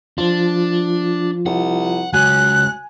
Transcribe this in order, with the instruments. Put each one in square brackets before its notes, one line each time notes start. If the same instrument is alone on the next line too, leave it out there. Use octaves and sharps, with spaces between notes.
[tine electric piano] F3 F4 [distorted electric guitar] D4
[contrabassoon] C2 [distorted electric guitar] F#5
[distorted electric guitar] C#3 G#3 [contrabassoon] F#3 [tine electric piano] G#5 [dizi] F#6